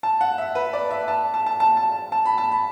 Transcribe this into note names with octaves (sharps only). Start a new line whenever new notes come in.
A5
F#5
E5
B4
D5
E5
A5
A5
A5
A5
A5
A5
B5
A5
B5